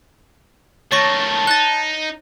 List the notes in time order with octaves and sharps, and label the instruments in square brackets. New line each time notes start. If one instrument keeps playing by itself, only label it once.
[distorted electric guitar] D#3 A3 [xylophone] C#5 C#6 A#6 [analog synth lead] A5
[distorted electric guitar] D#4 [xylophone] F#6 A6